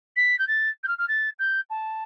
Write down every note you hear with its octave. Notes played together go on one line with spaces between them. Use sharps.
B6
G6
A6
G6
F6
F6
A6
G6
A5